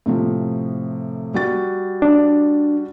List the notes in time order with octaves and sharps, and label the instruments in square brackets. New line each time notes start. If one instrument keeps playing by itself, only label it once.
[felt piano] A2 C3 F3
G3 F#4 A6
[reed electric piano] D4